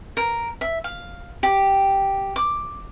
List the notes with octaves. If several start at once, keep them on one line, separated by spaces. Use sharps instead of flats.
A#4
E5
F5
G4
D6